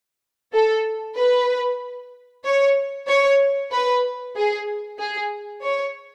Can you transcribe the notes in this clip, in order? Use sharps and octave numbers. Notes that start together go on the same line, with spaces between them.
A4
B4
C#5
C#5
B4
G#4
G#4
C#5